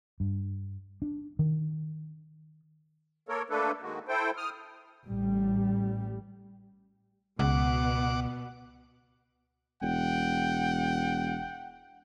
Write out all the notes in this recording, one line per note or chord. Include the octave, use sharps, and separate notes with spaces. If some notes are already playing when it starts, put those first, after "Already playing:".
G2
D4
D#3
A#3 A4 A#4 C#5
A3 A#3 D4 A4 B4
D#3 G#3 A#3 F#4
E4 A4 C5 G5
D#6 F6
A1 G3
C#2 B2 B3 F#5 D6
E1 F#5 G5